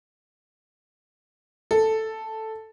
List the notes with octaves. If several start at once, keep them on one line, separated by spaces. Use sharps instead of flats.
A4